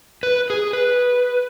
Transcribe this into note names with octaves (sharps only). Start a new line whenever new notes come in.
B4
G#4
B4